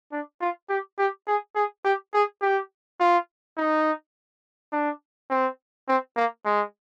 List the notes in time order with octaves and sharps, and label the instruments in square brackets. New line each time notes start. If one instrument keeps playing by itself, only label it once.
[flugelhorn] D4
F4
G4
G4
G#4
G#4
G4
G#4
G4
F4
D#4
D4
C4
C4
A#3
G#3